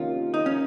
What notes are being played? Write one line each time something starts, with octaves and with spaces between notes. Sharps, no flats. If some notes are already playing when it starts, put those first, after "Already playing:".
Already playing: C3 D#3 A#3 C#4 F4
D#4
C#4